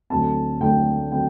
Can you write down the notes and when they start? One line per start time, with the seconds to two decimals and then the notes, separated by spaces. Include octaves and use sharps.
0.10 D2 D3 F#3 A3 C4 A5
0.61 D2 D3 F#3 A3 C4 G5
1.12 D3 F#3 A3 C4 G5